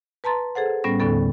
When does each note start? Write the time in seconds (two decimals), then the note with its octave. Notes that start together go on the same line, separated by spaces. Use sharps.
0.24 B4 A5 A#5 C6 A6
0.55 G#4 A4 C5 F#5
0.84 A2 G3 B3 C#4 A#6
1.00 D#2 A2 D3 B3 A4